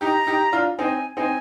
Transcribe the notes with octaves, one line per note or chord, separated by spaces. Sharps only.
D#4 G4 A#5
D#4 G4
D4 F4
C4 D#4 G#5
C4 D#4 G#5